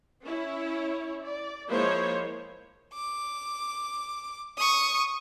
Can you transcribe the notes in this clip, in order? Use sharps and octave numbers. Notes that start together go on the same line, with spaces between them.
C#4 E4 C#5
D5
F3 G#3 A#3 E4 C5 C#5
D6
C#6 D#6